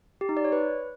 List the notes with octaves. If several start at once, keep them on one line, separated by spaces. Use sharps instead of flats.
G4
D#4
D5
C#5
B4